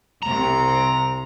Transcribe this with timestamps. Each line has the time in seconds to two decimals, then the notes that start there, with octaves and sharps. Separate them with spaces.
0.23 C2 C3 A#5